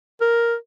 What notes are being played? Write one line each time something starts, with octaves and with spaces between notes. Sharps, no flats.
A#4